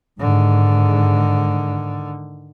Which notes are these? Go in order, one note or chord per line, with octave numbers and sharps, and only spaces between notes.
G#2 D3 D#3